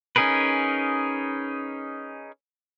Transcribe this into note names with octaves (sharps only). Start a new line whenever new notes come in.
C#4 D#4 G#4 A#4 B4